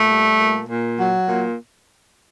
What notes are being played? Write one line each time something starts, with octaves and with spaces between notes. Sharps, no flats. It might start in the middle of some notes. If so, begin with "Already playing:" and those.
Already playing: A#2 A3
G3
A#2
A#2
F#3
A#2